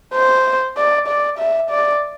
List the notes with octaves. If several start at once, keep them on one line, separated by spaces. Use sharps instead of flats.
C5
D5
D5
E5
D5